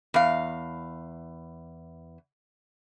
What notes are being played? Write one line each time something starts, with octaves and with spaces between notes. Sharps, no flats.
E2 F5